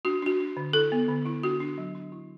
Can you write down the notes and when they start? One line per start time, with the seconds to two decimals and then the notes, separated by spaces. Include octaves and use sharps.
0.05 D4 F#4
0.22 D4 F#4
0.40 D4
0.57 D3
0.73 E4 A4
0.92 B3
1.08 D3
1.26 E4
1.43 D4 F#4
1.60 D4
1.78 F#3
1.95 D4
2.12 E4